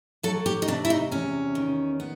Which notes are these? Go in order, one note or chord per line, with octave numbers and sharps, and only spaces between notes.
F#3 A4
G4
D#4
C3 D4
E4
D#4
E2 C#4
D#3
B3